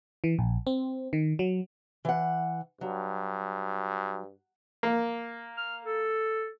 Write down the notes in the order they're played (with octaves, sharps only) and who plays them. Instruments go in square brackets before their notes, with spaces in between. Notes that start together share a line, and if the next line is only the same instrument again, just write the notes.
[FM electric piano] E3
A#1
C4
D#3
F#3
[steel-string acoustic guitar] E3 F#5
[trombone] G2 [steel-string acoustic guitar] F#3
[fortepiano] A#3
[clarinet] F6
A4